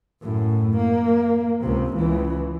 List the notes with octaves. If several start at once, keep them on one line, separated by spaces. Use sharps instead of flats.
F#2 A2
A#3
C#2 C3
C#2 E3